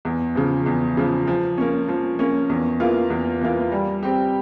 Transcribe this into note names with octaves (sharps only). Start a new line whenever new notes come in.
E2
C#3 F3
E2
C#3 F3
F3
A#3 C#4
F3
A#3 C#4
E2
E3 A#3 F4
E2
E3 A#3 F4
G3
C4 G4